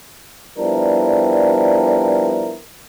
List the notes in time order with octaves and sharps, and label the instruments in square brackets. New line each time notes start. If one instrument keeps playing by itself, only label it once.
[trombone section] F3 G3 B3 D4 E4 A#4